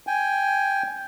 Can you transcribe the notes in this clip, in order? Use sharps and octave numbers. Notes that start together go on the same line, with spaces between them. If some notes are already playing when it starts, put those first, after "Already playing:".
G5 G#5